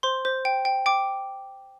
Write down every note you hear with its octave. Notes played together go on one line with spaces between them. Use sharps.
C5 C6
C5
G5
G5
G5 D6